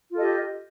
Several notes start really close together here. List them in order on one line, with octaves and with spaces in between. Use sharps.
F4 A4 D#5 G4